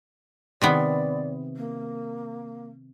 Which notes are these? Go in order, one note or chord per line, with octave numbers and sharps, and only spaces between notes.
C3 D#3 B3 D5
A#3